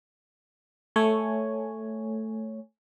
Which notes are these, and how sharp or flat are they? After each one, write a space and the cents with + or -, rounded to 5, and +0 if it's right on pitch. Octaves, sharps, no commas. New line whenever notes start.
A3 +0 C#5 +0 G#5 +0